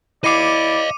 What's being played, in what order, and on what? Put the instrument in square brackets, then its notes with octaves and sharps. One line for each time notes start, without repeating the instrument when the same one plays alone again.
[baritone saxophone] E4 [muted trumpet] D5 [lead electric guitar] D#5 F5 [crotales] D6 C#7 D#7